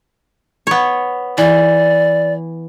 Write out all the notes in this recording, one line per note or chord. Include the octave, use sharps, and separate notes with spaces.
B3 C#5
E3 D5